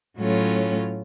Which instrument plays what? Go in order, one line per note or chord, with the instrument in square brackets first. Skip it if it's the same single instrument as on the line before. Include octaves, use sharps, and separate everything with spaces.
[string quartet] A2 F#3 A3 C#4 F4